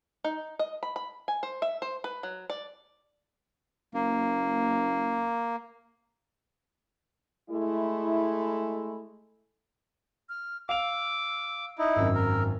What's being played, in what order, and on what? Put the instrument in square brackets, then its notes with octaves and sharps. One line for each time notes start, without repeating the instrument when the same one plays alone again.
[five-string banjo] D#4
D#5
B5
B5
G#5
C5
E5
C5
B4
F#3
D5
[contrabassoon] F#1 [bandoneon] A#3
[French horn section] G#3 A3 E4
[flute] F6
[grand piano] F5 F7 [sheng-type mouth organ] D6 [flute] E6
[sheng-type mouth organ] D#4 E4
[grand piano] G#1 F#2 [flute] E6
[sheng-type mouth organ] A#4